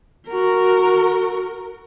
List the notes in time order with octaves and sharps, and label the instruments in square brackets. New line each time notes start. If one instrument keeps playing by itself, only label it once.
[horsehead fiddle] F#4 A#4